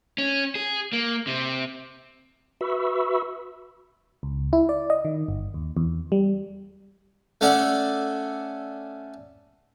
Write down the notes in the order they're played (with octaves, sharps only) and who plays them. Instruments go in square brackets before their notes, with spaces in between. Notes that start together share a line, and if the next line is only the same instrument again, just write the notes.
[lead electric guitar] C#4
G#4
A#3
C3
[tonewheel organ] F#4 B4 E5 B5 C#6 E6
[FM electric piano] C#2
E4
D5
D#5
D#3
G1
D#2
E2
G3
[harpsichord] A3 C#4 A4 D5 F#5